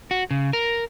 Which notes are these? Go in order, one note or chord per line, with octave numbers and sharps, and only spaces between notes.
F#4
C#3
A#4